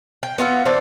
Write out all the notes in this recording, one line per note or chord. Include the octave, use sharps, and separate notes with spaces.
G5
B3 F4 F#4 E5
E3 C4 D4 D5